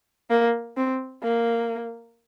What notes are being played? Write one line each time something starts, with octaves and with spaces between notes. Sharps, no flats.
A#3
C4
A#3